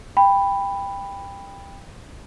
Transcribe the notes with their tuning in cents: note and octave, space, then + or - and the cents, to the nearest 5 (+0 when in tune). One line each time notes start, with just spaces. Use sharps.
G5 +20 B5 +0